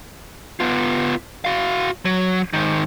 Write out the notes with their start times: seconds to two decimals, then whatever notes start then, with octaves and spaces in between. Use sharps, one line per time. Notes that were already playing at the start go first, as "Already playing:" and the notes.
0.60 B3 F4
1.45 F#4 F5
2.05 F#3
2.53 G#2 D#3